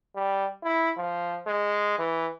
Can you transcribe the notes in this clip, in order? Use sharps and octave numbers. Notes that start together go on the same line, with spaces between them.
G3
E4
F3
G#3
E3